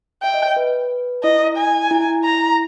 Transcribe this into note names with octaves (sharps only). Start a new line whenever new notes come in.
E5 G5
D#5
C#5
B4
E4 D#5
G#5
E4
A#5